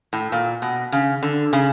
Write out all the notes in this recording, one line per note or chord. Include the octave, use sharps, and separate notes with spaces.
A2
A#2
B2
C#3
D3
C#3